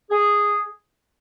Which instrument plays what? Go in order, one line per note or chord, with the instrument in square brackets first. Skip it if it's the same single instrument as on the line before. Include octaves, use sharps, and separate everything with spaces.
[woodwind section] G#4